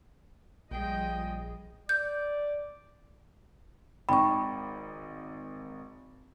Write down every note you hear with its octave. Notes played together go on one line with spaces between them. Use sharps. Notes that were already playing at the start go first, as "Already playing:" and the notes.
A#1 F3 G3 G#4 D#5 G5
D5 G6
G#1 D#4 G5 B5 C#6